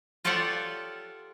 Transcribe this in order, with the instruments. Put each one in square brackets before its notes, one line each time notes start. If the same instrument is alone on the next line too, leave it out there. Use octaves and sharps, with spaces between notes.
[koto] F4 G4 A4 C#5 D5 F#5